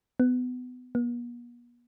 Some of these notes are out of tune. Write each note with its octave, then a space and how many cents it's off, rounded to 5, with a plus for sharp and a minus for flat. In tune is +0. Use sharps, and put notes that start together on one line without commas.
B3 +25
B3 -45